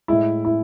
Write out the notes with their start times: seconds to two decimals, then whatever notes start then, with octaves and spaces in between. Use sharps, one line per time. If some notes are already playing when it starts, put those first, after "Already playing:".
0.08 A2 G#3 E4
0.45 E4